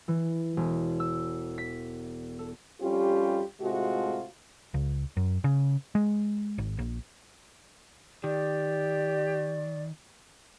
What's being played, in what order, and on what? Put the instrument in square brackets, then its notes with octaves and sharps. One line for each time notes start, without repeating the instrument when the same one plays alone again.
[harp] E3
E1
E6
B6
A4
[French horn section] F2 G3 C#4 F4 G4
A2 C3 G#3 A3 F4 F#4
[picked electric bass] C#2
F#2
C#3
G#3
G#1
A#1
[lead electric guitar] D#3 [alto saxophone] G4 [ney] D5